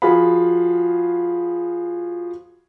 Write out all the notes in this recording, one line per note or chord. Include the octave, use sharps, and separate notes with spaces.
F3 F#4 G#4 F5 B5